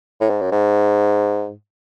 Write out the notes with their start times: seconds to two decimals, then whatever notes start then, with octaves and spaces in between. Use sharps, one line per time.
0.21 A2
0.30 G#2
0.41 F#2
0.52 G#2